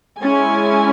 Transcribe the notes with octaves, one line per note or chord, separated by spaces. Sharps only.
G#3 C#4 E4 G#5